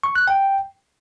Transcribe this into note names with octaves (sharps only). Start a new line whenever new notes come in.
C#6
F#6
G5